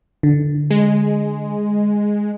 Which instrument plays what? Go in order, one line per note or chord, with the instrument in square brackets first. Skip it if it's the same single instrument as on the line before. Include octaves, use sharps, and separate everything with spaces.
[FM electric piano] D3
[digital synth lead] G#3